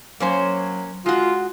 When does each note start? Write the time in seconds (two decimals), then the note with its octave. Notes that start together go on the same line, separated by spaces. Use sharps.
0.20 F#3 A#3 C#4 C5
1.06 G#3 F4 F#4